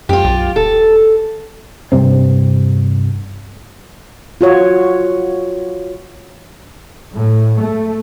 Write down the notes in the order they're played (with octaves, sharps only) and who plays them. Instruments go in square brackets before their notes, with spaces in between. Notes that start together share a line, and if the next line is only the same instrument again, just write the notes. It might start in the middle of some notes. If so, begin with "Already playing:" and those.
[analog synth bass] F#2 [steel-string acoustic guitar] F4 G4
[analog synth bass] B1
[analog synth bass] D#1 [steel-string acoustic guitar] A4
[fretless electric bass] G2 C3 C4
[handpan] F4 F#4 C#5
[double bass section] A2
A3